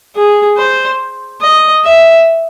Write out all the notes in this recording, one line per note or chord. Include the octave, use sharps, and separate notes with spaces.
G#4
C5
D#5
E5